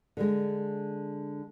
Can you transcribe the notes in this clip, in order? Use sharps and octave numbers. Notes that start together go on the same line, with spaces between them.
D3 G#3